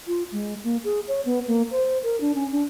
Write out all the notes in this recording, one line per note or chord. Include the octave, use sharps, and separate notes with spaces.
F4
G#3
A#3
G#4
C#5
B3
A#3
C5
A#4
D4
C#4
D4